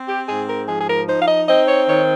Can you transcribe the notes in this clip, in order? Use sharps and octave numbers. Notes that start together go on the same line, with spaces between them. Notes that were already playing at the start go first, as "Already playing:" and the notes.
Already playing: C4
G4
G#2 G#4
A#4
F3 G#4
G#4
A#4
D#4 C5
F5
D#5
C4 D#5
C#5
D#3 C#5